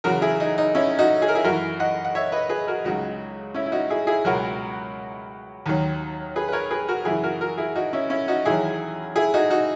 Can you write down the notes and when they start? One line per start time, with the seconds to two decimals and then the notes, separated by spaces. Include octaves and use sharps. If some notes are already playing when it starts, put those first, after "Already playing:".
0.04 E2 C#3 F#3 F#4 A#4
0.22 E4 G#4
0.40 D#4
0.58 D#4
0.75 C#4 E4
0.99 D#4 F#4
1.22 G#4
1.28 A#4
1.35 E4 G#4
1.44 F#2 F#4 A#4
1.50 E3
1.80 D#5 F#5
2.05 F#5
2.15 C#5 E5
2.32 B4 D#5
2.49 G#4 B4
2.67 F#4 A#4
2.84 C#2 C#3 F#3 D#4 F#4
3.54 C#4 E4
3.66 E4
3.72 D#4 F#4
3.90 E4 G#4
4.07 E4 G#4
4.25 C#2 B2 F#3 F#4 A#4
5.66 D#2 D#3 F#3
6.36 G#4 B4
6.48 B4
6.52 A#4 C#5
6.71 G#4 B4
6.88 F#4 A#4
7.05 F#2 C#3 E3 E4 G#4
7.24 F#4 A#4
7.40 F#4 A#4
7.57 E4 G#4
7.75 D#4 F#4
7.93 C#4 E4
8.10 C#4 E4
8.28 D#4 F#4
8.45 E2 D#3 F#3 E4 G#4
9.16 E4 G#4
9.34 D#4 F#4
9.50 D#4 F#4